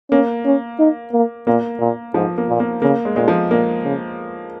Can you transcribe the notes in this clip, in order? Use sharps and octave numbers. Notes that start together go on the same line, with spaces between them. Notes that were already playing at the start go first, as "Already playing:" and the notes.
A#3 C#4
C#4
D#4
A#3
A#2 A#3
A#2
G#2 F3
A#3
A#2
A#3
C#3 A#3
G#3
A#2 G#3
F3
A#2 A#3
C#3